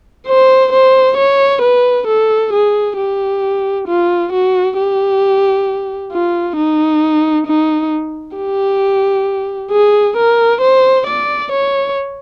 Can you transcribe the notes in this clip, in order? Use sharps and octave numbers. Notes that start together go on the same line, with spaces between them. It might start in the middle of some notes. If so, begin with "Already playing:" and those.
C5
C5
C#5
B4
A4
G#4
G4
F4
F#4
G4
F4
D#4
D#4
G4
G#4
A#4
C5
D5
C#5